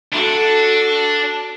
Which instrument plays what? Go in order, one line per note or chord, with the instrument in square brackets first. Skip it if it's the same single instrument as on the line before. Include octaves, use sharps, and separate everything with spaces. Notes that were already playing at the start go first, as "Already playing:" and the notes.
[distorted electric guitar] D4 [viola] F#4 A4